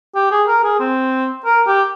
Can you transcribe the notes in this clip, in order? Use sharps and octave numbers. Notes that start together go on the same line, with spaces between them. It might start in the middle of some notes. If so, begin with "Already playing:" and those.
G4
G#4
A#4
G#4
C4
A#4
G4